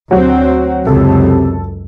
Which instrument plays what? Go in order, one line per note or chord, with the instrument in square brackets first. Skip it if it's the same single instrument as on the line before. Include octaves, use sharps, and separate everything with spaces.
[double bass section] D2 C4 [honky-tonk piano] F#3 F#4
[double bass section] C#2 F#2 [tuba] C3 [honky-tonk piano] A4